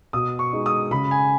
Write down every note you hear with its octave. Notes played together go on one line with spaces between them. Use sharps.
B2 D#6
C#6
G#3 D#4
D#6
C#3 B5
G#5